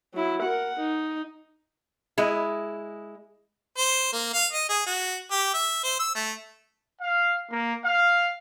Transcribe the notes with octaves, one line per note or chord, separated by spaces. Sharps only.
F#3 E4
A#4 F#5
D#4
G#3 E4
C5
A#3
F5
D#5
G#4
F#4
G4
E5
C5
E6
A3
F5
A#3
F5